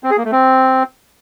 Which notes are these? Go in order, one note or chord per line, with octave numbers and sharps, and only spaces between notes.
C4
G#4
A#3
A3
C4